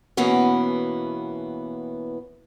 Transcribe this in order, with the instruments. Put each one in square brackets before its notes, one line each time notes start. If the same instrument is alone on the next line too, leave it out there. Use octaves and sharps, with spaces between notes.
[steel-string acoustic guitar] B2 E3 A#3 B3 C#4